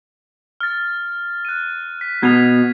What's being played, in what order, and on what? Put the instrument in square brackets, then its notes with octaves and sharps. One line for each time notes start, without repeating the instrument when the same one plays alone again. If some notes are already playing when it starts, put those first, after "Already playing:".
[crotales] F6 A6
F#6 D#7
B6
[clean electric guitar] B2 [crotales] G#6 B6 F7